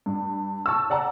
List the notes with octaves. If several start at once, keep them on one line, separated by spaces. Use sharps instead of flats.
G2
A5 C#6 E6
D5 F#5 A5 A#5